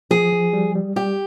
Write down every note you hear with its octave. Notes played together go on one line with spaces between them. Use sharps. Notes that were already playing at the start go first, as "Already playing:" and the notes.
F3 G#4
F3
G3
G3
G3 G4